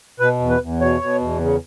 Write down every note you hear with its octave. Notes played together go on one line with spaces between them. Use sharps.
B2 B4
E2
B4
E2
B2 C#5
B2
E2
C#3